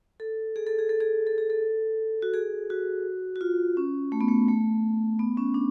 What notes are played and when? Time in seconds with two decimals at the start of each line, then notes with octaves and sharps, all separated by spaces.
0.20 A4
0.56 G#4
0.67 A4
0.79 G#4
0.89 A4
1.01 G#4
1.27 A4
1.38 G#4
1.50 A4
2.22 F#4
2.34 G#4
2.70 F#4
3.36 F#4
3.41 F4
3.77 C#4
4.12 A3
4.21 B3
4.28 A3
4.48 A3
5.19 B3
5.37 C#4
5.54 D4